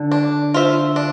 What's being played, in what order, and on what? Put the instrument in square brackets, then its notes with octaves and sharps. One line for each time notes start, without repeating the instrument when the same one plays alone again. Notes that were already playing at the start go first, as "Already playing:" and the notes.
Already playing: [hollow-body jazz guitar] D3
[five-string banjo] D4
F4 C5 E5
D4